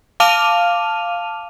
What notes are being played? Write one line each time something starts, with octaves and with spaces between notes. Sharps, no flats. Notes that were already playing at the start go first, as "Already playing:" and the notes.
F5 A5 D6 F6 D#7 F7